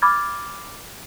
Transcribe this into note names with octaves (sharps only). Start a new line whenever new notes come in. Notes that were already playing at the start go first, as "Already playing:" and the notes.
B5 D6 F6 G#6 A6